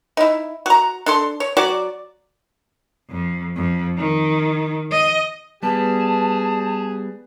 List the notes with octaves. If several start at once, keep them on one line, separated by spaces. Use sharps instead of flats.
D#4 E4
F#4 A#5
D4 A4 C6
C#5
F#3 F#4 D5
F2
F2
D#3
D#5
G3 B3 G#4 A5